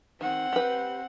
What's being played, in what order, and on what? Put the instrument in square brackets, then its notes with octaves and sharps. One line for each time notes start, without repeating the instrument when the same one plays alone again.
[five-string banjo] D#3 [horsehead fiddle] C4 F#5
[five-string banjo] G4 B4